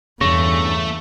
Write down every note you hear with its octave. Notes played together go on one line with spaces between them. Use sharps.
E2 G2 C#3 A3 C#6 A#6